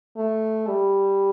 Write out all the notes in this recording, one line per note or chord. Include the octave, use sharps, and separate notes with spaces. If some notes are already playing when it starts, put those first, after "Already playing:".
A3
G3